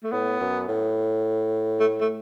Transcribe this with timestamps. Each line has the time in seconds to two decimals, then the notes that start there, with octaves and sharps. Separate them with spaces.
0.04 A3
0.12 A2 B3
0.40 F#2
0.68 A2
1.80 A3
2.01 A3